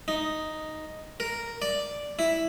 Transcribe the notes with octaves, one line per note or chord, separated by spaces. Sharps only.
D#4
A#4
D5
E4